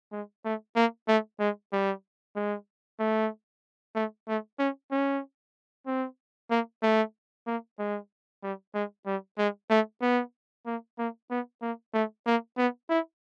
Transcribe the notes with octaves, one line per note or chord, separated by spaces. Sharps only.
G#3
A3
A#3
A3
G#3
G3
G#3
A3
A3
A3
C#4
C#4
C4
A#3
A3
A#3
G#3
G3
G#3
G3
G#3
A3
B3
A#3
A#3
B3
A#3
A3
A#3
B3
E4